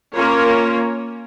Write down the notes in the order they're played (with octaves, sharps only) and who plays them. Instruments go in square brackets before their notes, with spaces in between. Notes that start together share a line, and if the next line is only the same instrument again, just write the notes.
[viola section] A#3 C#4 F4 A#4 C#5